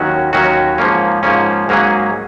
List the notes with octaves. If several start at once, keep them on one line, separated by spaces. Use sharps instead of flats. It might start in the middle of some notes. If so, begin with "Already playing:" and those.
Already playing: D#2 D#3 F#3 C#4 F#4
D#2 D#3 F#3 C#4 F#4
G#2 F3 A#3 C#4
G#2 F3 A#3 C#4
G#2 F#3 A#3 C#4 G#4